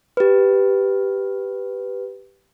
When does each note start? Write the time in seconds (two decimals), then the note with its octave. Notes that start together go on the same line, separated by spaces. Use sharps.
0.17 G4 B4